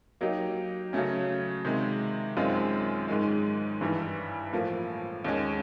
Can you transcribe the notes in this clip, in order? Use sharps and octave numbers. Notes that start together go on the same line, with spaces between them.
F#3 A#3 D#4 G4
C#3 F#3 A3 C#4
C3 D#3 G#3
F#2 D#3 G#3 C4 F4
G#2 D#3 G#3
G2 E3 G3
A2 F3 A#3
D#2 D#3 G#3 C#4